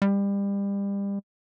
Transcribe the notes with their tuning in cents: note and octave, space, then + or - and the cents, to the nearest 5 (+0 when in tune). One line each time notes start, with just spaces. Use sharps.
G3 +30